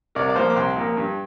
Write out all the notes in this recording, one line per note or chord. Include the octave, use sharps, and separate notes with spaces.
C2 A#4 D5
D5
A#2 F3 A#3 C5 F5
D6
C2 G5 C6
A#2 F3 A#3
G2